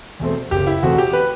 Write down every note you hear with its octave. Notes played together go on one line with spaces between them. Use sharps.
E2 B2 A3 C4
F#1 G4
E4
E2 B2 A3 C4 F#4
G4
B4